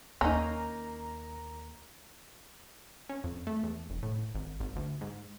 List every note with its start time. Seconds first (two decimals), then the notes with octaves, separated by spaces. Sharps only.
0.21 D#2 A#3 C#4 D#4 A#5
3.09 C#4
3.24 F2
3.47 A3
3.63 E2
3.90 F1
4.03 A2
4.35 G#1
4.60 G#1
4.76 D2
5.01 G#2